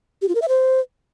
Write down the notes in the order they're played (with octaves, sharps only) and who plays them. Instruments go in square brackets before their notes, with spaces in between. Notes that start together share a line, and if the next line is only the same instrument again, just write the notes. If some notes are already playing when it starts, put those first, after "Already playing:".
[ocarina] G4
F4
A#4
E5
C5